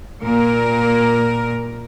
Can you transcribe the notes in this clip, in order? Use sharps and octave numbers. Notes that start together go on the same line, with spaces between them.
A#2 A#4